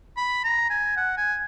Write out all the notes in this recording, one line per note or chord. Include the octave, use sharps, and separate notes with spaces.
B5
A#5
G#5
F#5
G#5